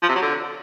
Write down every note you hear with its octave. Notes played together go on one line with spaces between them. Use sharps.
F3
C3
F#3
D3